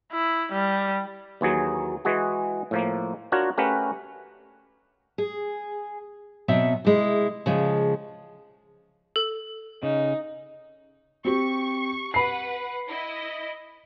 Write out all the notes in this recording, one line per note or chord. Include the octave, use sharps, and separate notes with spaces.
E4
G3
D#2 E3 F#3 G#4
E3 G#3 F#4 G#4
A2 F3 A#3
D4 F4 F#4 A#4 C#5
A3 C#4 G4 A#4 B4 F#5
G#4
B2 F#3 C4 E5 F#5
C3 G#3 E4
C#3 F3 G#3
A4
C#3 D#4
C4 G4 C#6
B4 F#5 B5 C7
E4 D#5